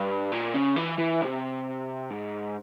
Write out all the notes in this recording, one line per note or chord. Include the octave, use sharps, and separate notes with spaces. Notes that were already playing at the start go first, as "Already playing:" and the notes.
Already playing: G2
A#2
C#3
E3
E3
C3
G#2